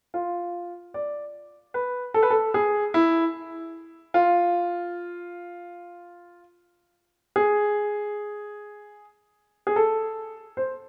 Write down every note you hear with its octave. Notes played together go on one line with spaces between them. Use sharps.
F4
D5
B4
A4
B4
A4
G#4
E4
F4
G#4
G#4
A4
C5